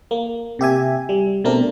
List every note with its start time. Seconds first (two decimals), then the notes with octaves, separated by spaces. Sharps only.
0.11 A#3
0.59 C3 G4 E5 G#5
1.09 G3
1.44 B2 A3 C4 D4 A#4